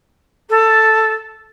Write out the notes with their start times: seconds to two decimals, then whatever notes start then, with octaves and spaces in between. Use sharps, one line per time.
0.49 A4